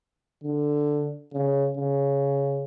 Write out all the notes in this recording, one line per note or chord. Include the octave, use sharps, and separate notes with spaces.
D3
C#3
C#3